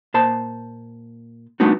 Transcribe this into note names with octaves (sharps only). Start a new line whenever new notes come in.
A#2 C5 A5
G3 A3 B3 D4 D#4 F#4